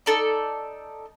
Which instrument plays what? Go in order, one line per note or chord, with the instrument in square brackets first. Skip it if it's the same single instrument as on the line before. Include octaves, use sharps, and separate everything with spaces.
[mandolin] D#4 A4 D5